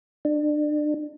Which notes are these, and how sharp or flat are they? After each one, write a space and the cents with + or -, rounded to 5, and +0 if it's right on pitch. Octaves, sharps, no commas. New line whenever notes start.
D4 +30